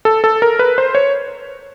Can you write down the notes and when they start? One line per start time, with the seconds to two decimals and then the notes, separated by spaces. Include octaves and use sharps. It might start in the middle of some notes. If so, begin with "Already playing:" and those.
0.05 A4
0.24 A4
0.42 A#4
0.59 B4
0.78 C5
0.95 C#5